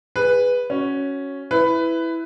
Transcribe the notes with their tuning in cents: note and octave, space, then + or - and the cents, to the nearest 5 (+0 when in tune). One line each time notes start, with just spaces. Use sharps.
G#4 -25 B4 +0
C#4 +0 F#4 +0
E4 +0 B4 +15